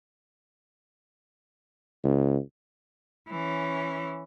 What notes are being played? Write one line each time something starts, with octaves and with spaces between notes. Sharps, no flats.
C#2
E3 C#4